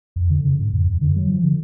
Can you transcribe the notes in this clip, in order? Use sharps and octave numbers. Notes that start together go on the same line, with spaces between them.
F2
D3
C#3
G#2
F2
F#2
D3
F#3
F3
D3